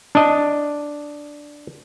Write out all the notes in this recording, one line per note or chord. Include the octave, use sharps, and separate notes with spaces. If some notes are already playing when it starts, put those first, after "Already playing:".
D4 D#5